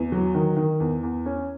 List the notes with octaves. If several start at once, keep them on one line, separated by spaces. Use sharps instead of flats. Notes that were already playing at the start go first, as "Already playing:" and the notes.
Already playing: E2
F#3
D#3
D#3
E2
E2
C#4